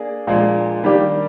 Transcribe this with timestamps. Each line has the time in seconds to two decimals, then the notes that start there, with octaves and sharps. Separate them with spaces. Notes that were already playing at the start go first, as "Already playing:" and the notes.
Already playing: A#3 D4 G#4
0.27 A#2 F3 G#3 D4
0.84 D#3 G3 A#3 D4 G4